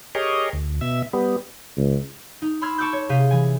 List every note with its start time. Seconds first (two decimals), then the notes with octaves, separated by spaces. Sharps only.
0.15 G4 G#4 A#4 C#5 D#5
0.53 D2
0.81 B2 E5
1.13 G3 B3
1.77 C#2
2.42 D#4
2.61 B5 C6 E6 F6 G#6
2.78 A5 C#6 D6 E6 F#6 G6
2.93 C#5
3.09 C3 G#4 F5 G6 B6 D#7
3.31 E3 G#5